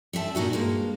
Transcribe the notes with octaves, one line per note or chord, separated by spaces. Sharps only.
G3 C4 E5 A5
A#2 D#4 F#4 G#5
G2 G#3 A#3